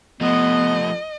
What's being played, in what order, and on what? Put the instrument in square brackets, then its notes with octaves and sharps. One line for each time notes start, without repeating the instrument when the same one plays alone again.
[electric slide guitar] F3 A3 [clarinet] B3 [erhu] D#5